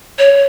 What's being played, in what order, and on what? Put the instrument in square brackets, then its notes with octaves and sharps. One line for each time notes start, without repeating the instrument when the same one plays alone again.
[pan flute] C#5